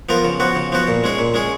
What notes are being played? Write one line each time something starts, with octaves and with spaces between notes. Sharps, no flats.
F3 B3 F4 A#4
C#3
F3 B3 F#4
C#3
F3 B3 F#4
A#2
G#3 C#4 G#4
A#2
G#3 C#4 G#4